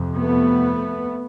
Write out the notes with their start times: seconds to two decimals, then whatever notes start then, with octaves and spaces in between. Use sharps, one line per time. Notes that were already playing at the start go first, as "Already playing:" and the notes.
Already playing: F2 C3
0.18 A3 B3